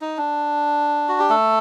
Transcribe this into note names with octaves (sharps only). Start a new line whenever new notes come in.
D#4
D4
F#4
G4
A3 A4